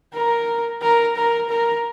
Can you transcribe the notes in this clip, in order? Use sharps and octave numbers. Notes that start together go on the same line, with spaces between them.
A#4
A#4
A#4
A#4